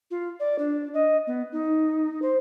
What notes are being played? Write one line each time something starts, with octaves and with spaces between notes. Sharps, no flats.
F4
D5
D4
D#5
B3
D#4
C5